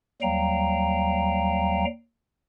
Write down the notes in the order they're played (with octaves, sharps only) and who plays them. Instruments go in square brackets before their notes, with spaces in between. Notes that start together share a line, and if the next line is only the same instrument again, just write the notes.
[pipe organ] D#2 F#3 G3 F5 G5 A#5